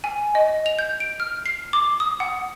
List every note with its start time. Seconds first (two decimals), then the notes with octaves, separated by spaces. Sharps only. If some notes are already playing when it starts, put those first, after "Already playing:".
0.04 G#5
0.35 D#5
0.66 F7
0.79 G6
1.00 D7
1.20 F6
1.46 C7
1.73 D6
2.00 D#6
2.20 F#5